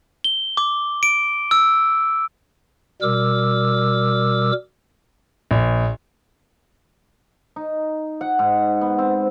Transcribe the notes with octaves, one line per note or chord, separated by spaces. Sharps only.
G7
D6
D7
E6
B2 G3 A#4 D6 E6
A#1
D#4
F#5
G#2
B3
C4